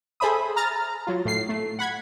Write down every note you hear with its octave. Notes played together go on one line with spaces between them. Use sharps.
G#4 A4 C5 E5 B5 D#6
A#5 F6 A6
F#3 F4
A2 C7
A3
F#5 B5 G#6